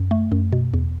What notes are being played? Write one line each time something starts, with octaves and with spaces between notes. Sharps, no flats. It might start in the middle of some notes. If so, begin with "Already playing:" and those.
Already playing: F#2
A3
F#2
B2
E2